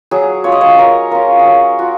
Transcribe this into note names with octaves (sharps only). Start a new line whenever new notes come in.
F#3 G#4
C#4 F4 C#5
D#5
C#5
F#3 A#4
C#4 F4 A#4
G#4
F#3 A#4
F4 F#4